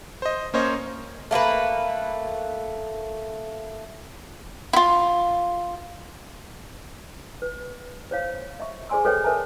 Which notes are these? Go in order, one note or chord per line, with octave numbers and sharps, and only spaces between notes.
C5 D#5
A#3 C#4 C5 C#5 D#5
A3 A#3 A#4 B4
E4 F4
B4
C5 C#5 F5
D#5 E5 C#6
G#4 C5 D5 G#5 C6 E6
A4 B4 C#5 D#5 G5
A#4 B4 E5 G#5 A5